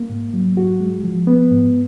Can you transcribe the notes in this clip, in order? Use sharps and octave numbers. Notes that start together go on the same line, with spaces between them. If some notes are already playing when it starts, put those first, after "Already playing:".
Already playing: A#3
G#2
F#3
G#2 F#4
G#3
F3
B3
G#2